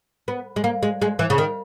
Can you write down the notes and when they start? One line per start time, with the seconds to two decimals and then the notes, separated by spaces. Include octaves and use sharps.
0.28 B3
0.56 G#3
0.64 A#3
0.83 G#3
1.01 G#3
1.19 E3
1.30 C#3
1.38 D#3